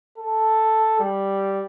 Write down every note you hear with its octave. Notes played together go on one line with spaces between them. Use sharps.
A4
G3